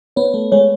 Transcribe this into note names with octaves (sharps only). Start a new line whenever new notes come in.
B3 C#5
A3
G#3 C#5